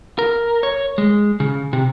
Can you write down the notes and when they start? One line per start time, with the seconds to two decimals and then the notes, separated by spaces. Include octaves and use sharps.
0.19 A#4
0.63 C#5
0.98 G#3
1.40 C#3
1.73 C3